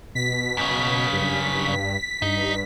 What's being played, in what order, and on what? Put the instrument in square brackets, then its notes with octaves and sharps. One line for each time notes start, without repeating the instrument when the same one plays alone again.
[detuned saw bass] B2 [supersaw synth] B6
[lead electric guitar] F#2 C#3
[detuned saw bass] G2
[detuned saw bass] G2 [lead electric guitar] D#4